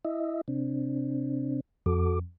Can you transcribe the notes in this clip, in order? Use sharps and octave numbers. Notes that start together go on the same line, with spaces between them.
E4 D#5 E5
C3 C4 D4
F2 F#4 A4 D6